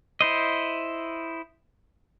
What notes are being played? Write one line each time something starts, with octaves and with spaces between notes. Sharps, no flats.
E4 C5 D#5